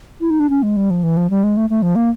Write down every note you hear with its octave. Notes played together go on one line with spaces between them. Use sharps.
E4
D#4
D4
C#4
G#3
G3
F3
E3
F3
G3
G#3
A3
A3
F3
A#3